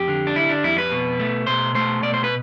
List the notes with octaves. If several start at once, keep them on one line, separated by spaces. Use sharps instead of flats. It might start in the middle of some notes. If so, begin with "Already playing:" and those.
Already playing: F2 G4
D3
D4
G3 E4
D4
F2 E4
B4
B2
A3
B2 C5
A3 C5
B2 D5
C5
B4